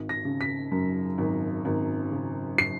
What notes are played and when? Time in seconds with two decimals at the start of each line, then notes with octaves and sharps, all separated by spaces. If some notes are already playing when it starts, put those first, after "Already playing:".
Already playing: G#1
0.09 A#6
0.25 C#3
0.41 B6
0.72 F#2
1.18 G#1
1.65 G#1
2.12 C#3
2.58 C7